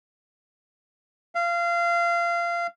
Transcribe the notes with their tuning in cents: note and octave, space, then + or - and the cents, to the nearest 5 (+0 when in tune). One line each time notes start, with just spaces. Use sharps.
F5 -25